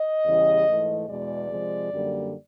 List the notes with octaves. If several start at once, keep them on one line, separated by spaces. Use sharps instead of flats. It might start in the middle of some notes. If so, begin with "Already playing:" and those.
Already playing: D#5
E2 C#3 E3 G3
G#2 E3 A3
E2 B2 G#3 D5
C3 F3 G#3
F#2 D3 G3 A#3